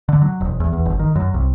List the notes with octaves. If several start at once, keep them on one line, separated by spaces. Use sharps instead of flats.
D3
F#3
E1
E2
E2
G1
D#3
F#2
C2